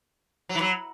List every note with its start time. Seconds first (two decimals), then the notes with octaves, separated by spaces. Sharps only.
0.49 F#3
0.55 E3
0.61 F#3